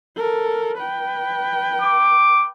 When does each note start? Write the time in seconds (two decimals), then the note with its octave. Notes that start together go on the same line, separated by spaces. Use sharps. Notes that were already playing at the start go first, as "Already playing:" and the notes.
0.16 A4 A#4
0.77 B4 G5
1.82 D6